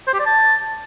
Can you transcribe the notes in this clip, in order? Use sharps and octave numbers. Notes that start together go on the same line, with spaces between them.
C5
G4
D5
A5